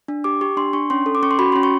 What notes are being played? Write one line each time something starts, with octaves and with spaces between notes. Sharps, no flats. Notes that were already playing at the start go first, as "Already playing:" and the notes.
D4
G4 D6
G4 C#6
D4 C6
D4 C#6
C#4 C6
A4
D6
C#4 C#6
C6
F#4 B5
C#4 C6
C#6